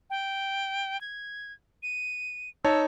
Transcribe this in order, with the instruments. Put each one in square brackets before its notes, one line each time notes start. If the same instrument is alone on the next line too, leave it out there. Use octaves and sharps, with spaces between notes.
[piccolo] G5
G#6
D#7
[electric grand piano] D#4 C#5 A5 [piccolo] E6